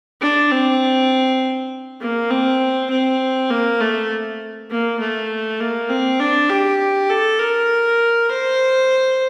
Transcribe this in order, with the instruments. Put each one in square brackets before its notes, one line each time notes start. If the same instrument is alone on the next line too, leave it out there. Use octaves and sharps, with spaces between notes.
[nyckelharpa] D4
C4
A#3
C4
C4
A#3
A3
A#3
A3
A#3
C4
D4
G4
A4
A#4
C5